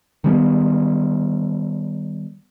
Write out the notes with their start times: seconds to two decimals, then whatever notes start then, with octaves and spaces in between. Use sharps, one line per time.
0.24 D#3 G3 B3